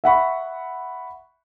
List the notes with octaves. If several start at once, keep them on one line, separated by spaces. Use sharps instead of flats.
E5 F#5 B5 C#6